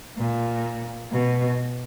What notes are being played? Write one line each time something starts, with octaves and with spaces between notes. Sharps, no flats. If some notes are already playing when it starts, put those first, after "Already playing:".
A#2
B2